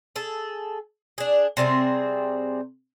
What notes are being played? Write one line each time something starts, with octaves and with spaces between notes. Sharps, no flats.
G#4 A4
D4 G#4
C3 G3 C4 G#4